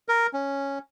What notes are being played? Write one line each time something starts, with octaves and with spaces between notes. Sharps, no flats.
A#4
C#4